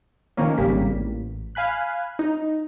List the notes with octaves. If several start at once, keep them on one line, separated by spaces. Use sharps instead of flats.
D#3 F3 A#3 C#4
G#1 C#3 G3 A#3 B6
A1
F5 G#5 B5 F#6
D#4